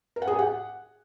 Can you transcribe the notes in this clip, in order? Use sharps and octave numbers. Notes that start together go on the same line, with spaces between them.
A#4
F#5
G#4
G4
F#5